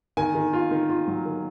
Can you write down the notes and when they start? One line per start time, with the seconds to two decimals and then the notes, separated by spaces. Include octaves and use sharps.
0.17 D#3 G#5
0.35 D#3
0.53 F4
0.71 D#3
0.90 F4
1.08 F#3
1.26 D#3